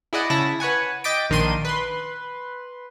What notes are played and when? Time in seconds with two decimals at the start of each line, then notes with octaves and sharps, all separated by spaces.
0.13 E4 G#4 D5 D#5 F#5
0.30 C#3 E4 E5 A5 A#6
0.60 B4 C#5 F#5 G#5
1.04 D#5 G5 D6 A6 B6 D7
1.30 A#1 D#3 D4 C6 D#7
1.65 B4 C6